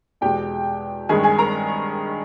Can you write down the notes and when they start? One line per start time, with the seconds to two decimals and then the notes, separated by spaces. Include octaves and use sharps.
0.21 E2 B2 G#3 G4 G5
1.09 G2 D#3 G#3 G#4 G#5
1.23 G#4 G#5
1.38 A#4 A#5